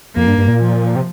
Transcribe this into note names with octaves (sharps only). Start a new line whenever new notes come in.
F2 A#3
G2
G2
A#2
F3
C3